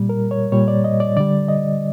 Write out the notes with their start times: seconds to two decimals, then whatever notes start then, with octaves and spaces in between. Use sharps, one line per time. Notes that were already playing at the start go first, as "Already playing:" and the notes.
Already playing: A#2 G3
0.09 A#4
0.31 C#5
0.52 A#2 G3 C#5
0.68 D5
0.84 D#5
1.00 D5
1.16 D3 G3 D5
1.48 D#5